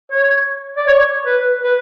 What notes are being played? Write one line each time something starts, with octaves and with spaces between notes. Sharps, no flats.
C#5
D5
C#5
B4
B4